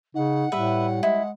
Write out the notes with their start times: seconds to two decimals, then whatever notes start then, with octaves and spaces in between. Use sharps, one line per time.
0.15 C#3 D#4 F#5
0.52 A2 G3 B4 E5
1.03 G#3 E4